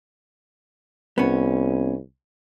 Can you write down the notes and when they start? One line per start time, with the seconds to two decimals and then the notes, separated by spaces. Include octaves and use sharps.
1.18 C2 B3 C#4